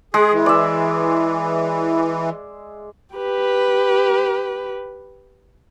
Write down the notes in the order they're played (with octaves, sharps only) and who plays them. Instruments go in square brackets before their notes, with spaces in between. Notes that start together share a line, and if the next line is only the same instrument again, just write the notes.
[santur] G#3 [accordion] G#4
[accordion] E3
[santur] D5 E5
[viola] G4 B4